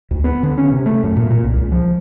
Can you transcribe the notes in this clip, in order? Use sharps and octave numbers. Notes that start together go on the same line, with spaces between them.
D2
B3
D3
C#4
C3
A3
F#2
A#2
A#2
C2
C#2
F3